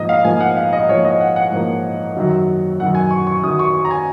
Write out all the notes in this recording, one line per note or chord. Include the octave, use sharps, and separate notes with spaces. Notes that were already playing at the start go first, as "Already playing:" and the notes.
Already playing: G#2 F3 A#3 D#5
F5
G#2 F3 A#3 G#5
F#5
F5
D#5
G#2 F3 A#3 C#5
D#5
F#5
F#5
G#2 F3 A#3
F#2 D#3 F#3
F#2 D#3 F#3 F#5
G#5
C#6
C#6
F#2 D#3 F#3 D#6
C#6
C#6
A#5
G#5